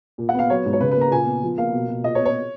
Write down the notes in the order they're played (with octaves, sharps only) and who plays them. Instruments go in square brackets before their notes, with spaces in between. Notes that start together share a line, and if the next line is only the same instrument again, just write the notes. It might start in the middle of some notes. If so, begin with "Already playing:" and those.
[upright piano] A#2
F#5
B3 F5
F#3 C#5
G#2
C#5
C#3 B4
B4
A#3 A#5
A#2 G#5
B3
F3
A#3 F5
B2
B2
A#2 D#5
C#5
B3
C#5